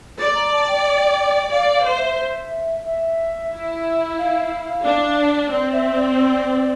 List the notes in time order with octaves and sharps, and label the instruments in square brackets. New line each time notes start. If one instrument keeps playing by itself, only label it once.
[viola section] D5 [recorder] A6
[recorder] A#5
A5
G5
[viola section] D5 [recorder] F5
[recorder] F5
[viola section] C5
[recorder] E5
E5
[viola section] E4
[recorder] F5
[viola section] D4
[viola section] C4 [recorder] D5
[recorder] E5
D5
D5